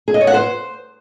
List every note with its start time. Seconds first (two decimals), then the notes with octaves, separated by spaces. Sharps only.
0.08 G#4
0.14 D#5
0.21 C#5
0.27 F#5
0.34 C5